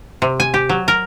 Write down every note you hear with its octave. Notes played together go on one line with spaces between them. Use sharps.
C3
G#5
G4
F#3
A#4